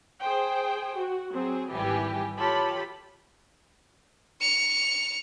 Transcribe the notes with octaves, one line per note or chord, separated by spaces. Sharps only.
G#4 C5 G5
F#4
F#3 C4 G#4
G#1 E3 G3 G4 G#5
E3 F4 G4 A4 C#5 B5
C#7 F7